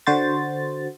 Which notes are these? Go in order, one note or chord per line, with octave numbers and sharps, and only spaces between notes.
D3 F#4 C5 A6